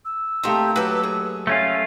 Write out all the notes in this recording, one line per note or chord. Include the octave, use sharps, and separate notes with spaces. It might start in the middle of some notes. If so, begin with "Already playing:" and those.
E6
A3 A#3 C4 D#4 G4
F#3 G4 A4 B4
G#4
A3 C#4 F4 G#5